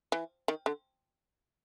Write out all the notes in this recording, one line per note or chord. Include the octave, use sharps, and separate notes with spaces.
E3
D#3
D3